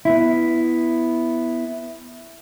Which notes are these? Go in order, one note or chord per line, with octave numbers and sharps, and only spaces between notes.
B3 E4